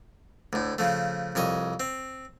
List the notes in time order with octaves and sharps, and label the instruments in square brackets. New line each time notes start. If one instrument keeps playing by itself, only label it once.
[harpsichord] D2 A2
C#3 F3 A3
C2 F2 C#5 D#5
C4